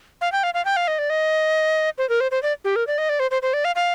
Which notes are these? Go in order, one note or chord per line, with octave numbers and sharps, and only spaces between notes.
F5
G5
F5
F5
G5
F5
D#5
D5
D#5
C5
A#4
C5
C5
D5
G4
A#4
D5
D#5
D5
C5
C5
C5
D5
F5
F5